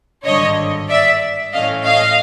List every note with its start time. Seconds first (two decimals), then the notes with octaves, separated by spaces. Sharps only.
0.24 G#1 G2 D3 C#5 D#5
0.89 D5 E5
1.53 A2 E3 A3 C#4 D#5 F5
1.85 D#5 F5